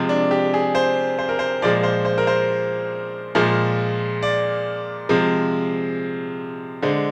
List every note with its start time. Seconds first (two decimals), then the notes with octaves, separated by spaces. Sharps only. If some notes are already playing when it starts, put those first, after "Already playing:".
Already playing: C3 F3 G#3
0.09 D4
0.31 G4
0.54 G#4
0.75 C5
1.19 C5
1.29 A#4
1.39 C5
1.62 A#2 F3 G#3 D5
1.83 C5
2.05 C5
2.18 A#4
2.27 C5
3.35 A#2 F3 G#3
4.23 D5
5.09 C3 F3 G#3
6.82 D3 G#3 C5